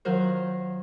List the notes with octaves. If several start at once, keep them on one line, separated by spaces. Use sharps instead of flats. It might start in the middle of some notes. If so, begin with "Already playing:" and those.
D#3 F#3 F4 F#4 A#4 C5